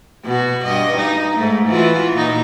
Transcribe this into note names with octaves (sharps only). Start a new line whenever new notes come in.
B2 F#4
G2 D#5
D#4
G#2 A3
E3 F4 F#4
A#2 D#4